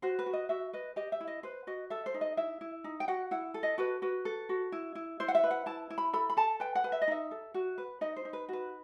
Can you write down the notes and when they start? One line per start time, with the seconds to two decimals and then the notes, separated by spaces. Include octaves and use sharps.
0.02 F#4 C5
0.19 B4
0.26 F#4
0.33 D#5
0.49 F#4 E5
0.73 B4 D#5
0.96 G4 D#5
1.12 E5
1.21 E4
1.27 D#5
1.43 B4 C5
1.67 F#4 D#5
1.90 A4 E5
2.06 C5
2.14 D#4
2.21 D#5
2.37 E4 E5
2.61 E4
2.84 D#4
3.00 G5
3.08 F#4 F#5
3.31 E4 F#5
3.54 A4
3.63 D#5
3.78 F#4 B4
4.02 F#4 B4
4.25 A4
4.49 F#4
4.72 E4
4.95 E4
5.20 E4 C5
5.28 F#5
5.35 E5
5.43 B4
5.51 F#5
5.66 E4 A5
5.90 E4
5.98 B5
6.13 A4 B5
6.30 B5
6.37 A4 A5
6.60 B4 G5
6.75 F#5
6.84 B4
6.92 E5
7.02 D#5
7.08 D#4 E5
7.31 A4
7.54 F#4
7.78 B4
8.01 D#4 D#5
8.16 C5
8.25 D#4
8.33 B4
8.49 F#4 B4